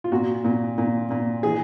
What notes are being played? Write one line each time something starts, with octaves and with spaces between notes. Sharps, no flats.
F4
A#2 F#4
A#2
A#2
A#2
E3 G#4